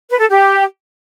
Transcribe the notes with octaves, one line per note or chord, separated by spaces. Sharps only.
B4
A4
G4